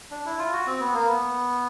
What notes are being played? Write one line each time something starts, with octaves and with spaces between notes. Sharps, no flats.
D4
E4
F4
F#4
C4
B3
A#3
B3